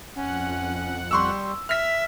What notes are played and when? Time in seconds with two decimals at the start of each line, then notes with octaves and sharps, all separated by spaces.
0.15 F2 C#4 F#5
1.11 G3 C6 C#6 E6
1.69 E5 F6 B6